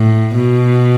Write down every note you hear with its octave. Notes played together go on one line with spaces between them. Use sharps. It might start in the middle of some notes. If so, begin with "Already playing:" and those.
Already playing: A2
B2